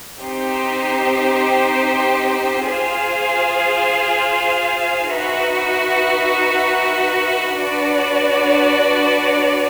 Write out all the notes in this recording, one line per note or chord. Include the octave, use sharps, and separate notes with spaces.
C4 D#4 G4 C5
F4 G#4 C5 F5
D#4 F#4 B4 E5
D4 F#4 B4 D5